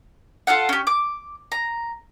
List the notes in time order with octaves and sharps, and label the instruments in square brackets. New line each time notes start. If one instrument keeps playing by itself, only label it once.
[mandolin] F4 A4 F5 F#5
C#4 G4
D6
A#5